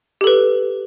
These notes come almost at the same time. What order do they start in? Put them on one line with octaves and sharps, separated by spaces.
G4 A4 B4